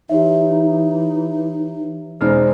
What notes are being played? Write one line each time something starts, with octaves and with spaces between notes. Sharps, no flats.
E3 D#4 G4 C#5 E5
E1 G#3 D#4 C5 F6